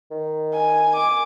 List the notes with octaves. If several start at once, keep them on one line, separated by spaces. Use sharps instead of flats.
D#3
G#5
D6